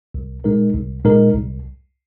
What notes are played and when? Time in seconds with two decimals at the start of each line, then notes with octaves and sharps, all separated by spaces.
0.14 C2
0.44 A#2 G#3 D#4 A#4
0.75 C2
1.04 A#2 G#3 D#4 A#4
1.34 C2